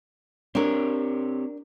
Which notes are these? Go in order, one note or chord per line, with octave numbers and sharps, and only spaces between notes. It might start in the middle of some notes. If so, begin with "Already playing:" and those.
C4 D4 G4 A#4 C#5